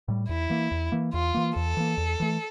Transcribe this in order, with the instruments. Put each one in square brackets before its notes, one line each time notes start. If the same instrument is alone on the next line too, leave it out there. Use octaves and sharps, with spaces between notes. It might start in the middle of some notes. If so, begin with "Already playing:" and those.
[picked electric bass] A2 G3
[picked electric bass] E2 [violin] E4
[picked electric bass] E3 A#3
E2
E3 A#3
[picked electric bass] E2 [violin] F4
[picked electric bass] E3 A#3
[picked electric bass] E2 [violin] A4
[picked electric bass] E3 A#3
E2
E3 A3